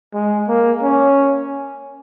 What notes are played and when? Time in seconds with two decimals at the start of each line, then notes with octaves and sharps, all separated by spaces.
0.14 G#3
0.48 A#3
0.83 C#4